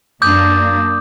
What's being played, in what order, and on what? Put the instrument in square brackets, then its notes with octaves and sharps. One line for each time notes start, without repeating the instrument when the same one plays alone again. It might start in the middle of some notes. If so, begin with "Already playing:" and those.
[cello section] F#2 A#3 D4 [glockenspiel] D6 D#6 G6